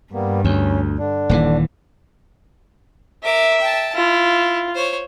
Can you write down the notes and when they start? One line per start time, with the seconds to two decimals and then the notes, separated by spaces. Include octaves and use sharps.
0.14 G2 G3 A#3 B3
0.45 D2 C#4
0.99 D3 D4
1.29 D#1 D#2 E3
3.23 A#4 E5 D6
3.60 G5 A5
3.95 E4 F4
4.75 C5 C#5